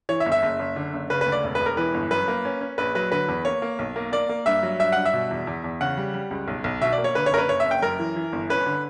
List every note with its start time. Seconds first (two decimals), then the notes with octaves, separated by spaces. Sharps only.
0.09 E3 C#5
0.20 E5
0.26 G1
0.32 E5
0.43 F#1
0.59 F#1
0.76 D3
0.93 F#1
1.10 C#3 B4
1.21 B4
1.26 D2
1.32 D5
1.44 E1
1.55 B4
1.60 E1
1.66 A#4
1.77 E3 B4
1.94 G1
2.11 F#2 B4
2.28 A#3
2.45 C#4
2.61 C#4
2.78 A#1 B4
2.95 F#3 B4
3.12 D3 B4
3.28 E2
3.45 A#3 C#5
3.62 A#3
3.79 B1
3.96 A#3
4.12 A#3 D5
4.29 A#3
4.46 G2 E5
4.63 F#3
4.80 G2 E5
4.92 G2 F#5
5.05 E5
5.13 B2
5.31 E2
5.47 E2
5.64 E2
5.81 C#3 F#5
5.97 G3
6.14 G3
6.31 C#2
6.48 B1
6.64 B1
6.81 B2 E5
6.92 D5
6.98 A#3
7.04 C#5
7.15 D3 B4
7.26 C#5
7.32 F#1 A#4
7.38 B4
7.49 F#1 C#5
7.60 E5
7.66 F#1
7.71 G5
7.82 F#2 A#4
7.99 E3
8.16 E3
8.33 G1
8.50 C#4 B4
8.66 D3